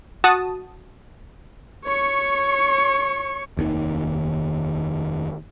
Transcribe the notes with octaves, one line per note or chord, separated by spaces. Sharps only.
F#4 A5 D#6
C#5 C#6
F1 D#2 B2 D#3